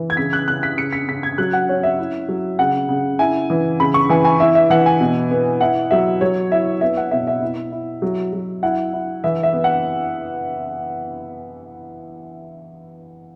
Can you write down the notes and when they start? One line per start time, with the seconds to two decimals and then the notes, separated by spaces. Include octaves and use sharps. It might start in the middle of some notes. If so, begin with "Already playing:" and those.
Already playing: E3
0.10 G#6
0.17 C#3 B6
0.33 F#6
0.48 C#3 F#6
0.63 B6
0.78 C#3 C#7
0.93 B6
1.08 C#3 B6
1.23 G#6
1.38 F#3 F#6
1.53 F#5
1.69 C#4 C#5
1.83 E5
1.99 E4
2.29 F#3
2.59 C#3 F#5
2.89 C#3
3.19 E4 G#5
3.50 E3
3.80 C#3 B5
3.94 C#6
4.09 E3 G#5
4.25 G#5
4.40 E4 E5
4.55 E5
4.70 E3 F#5
4.86 G#5
5.00 B2
5.31 B3
5.61 E4 F#5
5.91 F#3 E5
6.21 F#3 C#5
6.52 E4 E5
6.81 B3 E5
6.97 F#5
7.11 B2 E5
7.27 E5
7.42 E4
7.72 E4
8.02 F#3
8.33 F#3
8.63 E4 F#5
8.93 E4
9.24 E3 E5
9.43 E5
9.53 B3
9.64 F#5